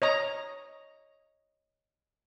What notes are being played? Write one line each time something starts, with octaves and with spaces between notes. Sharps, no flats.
C#5 D#5 A#5